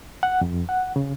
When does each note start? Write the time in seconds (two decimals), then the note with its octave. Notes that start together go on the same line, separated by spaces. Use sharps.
0.23 F#5
0.41 F2
0.69 F#5
0.96 C#3